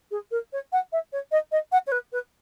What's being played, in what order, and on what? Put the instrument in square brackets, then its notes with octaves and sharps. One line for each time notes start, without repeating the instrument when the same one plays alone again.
[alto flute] G#4
A#4
C#5
F#5
E5
C#5
D#5
D#5
F#5
C#5
B4
B4